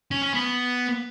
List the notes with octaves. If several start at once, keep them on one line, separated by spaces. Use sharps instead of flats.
C#4
C#4
B3